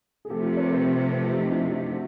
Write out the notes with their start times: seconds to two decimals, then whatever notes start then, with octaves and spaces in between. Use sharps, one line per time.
0.25 G#4
0.30 C3 F3 A3 G4 A4
0.43 F4 G4
0.57 B4 C#5
0.70 A#4 C5
1.11 A4 B4
1.24 F4 G4
1.38 D#4 F4
1.51 D4 E4
1.72 D4 E4
1.92 F#4